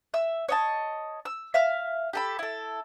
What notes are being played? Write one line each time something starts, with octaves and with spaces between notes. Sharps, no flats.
E5 E6
C#5 D#5 A5
E6
E5 F5 F6
G4 A4 B5
E4 A4